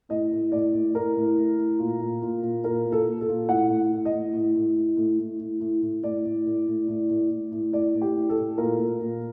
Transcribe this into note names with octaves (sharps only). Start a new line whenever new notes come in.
A2 D#5
A2
A2 D5
A2
A2 A#4
A2
A2
A2
A#2
A#2
A#2
A#2
A#2 A#4
A#2
A4
A#2
A4
A#2
A2 F#5
A2
A2
D#5
A2
A2
A2
A2
A2
A2
A2
A2
A2
A2 D5
A2
A2
A2
A2
A2
A2
A2
A2 D5
A2
G4
A2
A4
A2
A#2 A#4
A#2
A#2